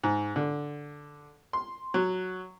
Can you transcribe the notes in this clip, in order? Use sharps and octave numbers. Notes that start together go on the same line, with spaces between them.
G#2
D3
C6
F#3